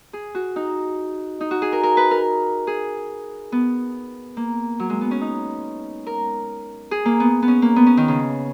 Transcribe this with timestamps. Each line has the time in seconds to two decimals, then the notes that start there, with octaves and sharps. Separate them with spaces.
0.13 G#4
0.35 F#4
0.56 D#4
1.41 D#4
1.51 F#4
1.62 G#4
1.72 A#4
1.83 A#4
1.97 B4
2.11 A#4
2.67 G#4
3.52 B3
4.37 A#3
4.80 F#3
4.90 G#3
5.01 B3
5.11 C#4
5.21 D#4
6.07 A#4
6.91 G#4
7.05 A#3
7.20 B3
7.42 B3
7.48 C#4
7.62 A#3
7.76 B3
7.86 C#4
7.97 D#3
8.08 C#3